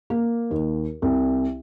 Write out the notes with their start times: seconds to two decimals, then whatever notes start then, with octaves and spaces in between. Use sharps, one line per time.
0.10 A#3
0.51 D#2
1.02 C2